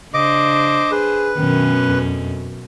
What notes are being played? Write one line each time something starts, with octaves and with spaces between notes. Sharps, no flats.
C#3 D4 C5 D#5 D6
G#4 B4
F#2 B2 D#3 C#4
F2